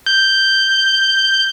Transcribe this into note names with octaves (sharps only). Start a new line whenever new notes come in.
G6